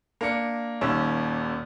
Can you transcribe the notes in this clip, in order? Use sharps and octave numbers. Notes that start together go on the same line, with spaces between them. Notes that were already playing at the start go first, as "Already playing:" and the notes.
A#3 D4 D5 C#7
D#1 D#2 C#4 E6